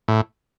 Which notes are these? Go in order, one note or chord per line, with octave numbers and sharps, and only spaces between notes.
A2